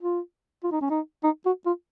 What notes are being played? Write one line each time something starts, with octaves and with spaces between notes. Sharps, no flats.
F4
F4
D#4
C#4
D#4
D#4
F#4
F4